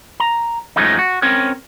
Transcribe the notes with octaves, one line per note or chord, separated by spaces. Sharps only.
A#5
F#2 F3 G#3 A3 D#4
F#4
C4 C#4 A#4 C#5